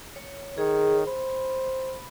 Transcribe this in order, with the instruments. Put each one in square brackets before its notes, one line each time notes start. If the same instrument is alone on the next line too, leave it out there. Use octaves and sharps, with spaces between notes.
[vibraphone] C#5
[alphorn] D#3 [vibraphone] G#4 C#5
[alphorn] C5 [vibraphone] B5